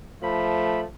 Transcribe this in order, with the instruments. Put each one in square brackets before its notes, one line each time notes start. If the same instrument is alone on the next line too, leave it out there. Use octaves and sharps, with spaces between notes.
[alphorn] F3 [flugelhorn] A3 [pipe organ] B5